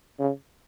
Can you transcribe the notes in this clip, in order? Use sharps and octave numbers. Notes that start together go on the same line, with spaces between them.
C#3